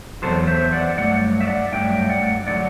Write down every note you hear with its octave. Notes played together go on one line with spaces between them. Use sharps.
E2 C3 F#3 A4 C5
C5 E5
D5 F#5
G2 F#3 A3 D5 F#5
E5
D5 F#5
G2 F#3 A3 E5 G5
D5 F#5
D3 F#3 A3 D5 F#5